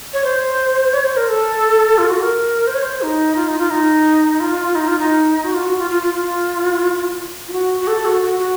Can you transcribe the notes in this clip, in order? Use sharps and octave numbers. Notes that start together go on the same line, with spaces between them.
C#5
C5
C#5
C5
A#4
A4
F4
F#4
A#4
C5
C#5
C5
D#4
F4
D#4
F4
D#4
F4
D#4
F4
D#4
F#4
F4
F#4
F4
F4
F4
F4
F4
F#4
F#4
A4
F#4
F#4
F#4